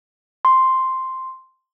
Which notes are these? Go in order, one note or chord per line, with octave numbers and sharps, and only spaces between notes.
C6